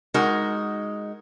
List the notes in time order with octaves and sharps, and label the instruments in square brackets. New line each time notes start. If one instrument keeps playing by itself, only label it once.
[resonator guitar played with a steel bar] G#3 D#4 F#4 A#4